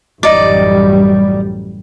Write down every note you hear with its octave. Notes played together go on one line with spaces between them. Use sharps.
A1 F#2 G3 D#4 D5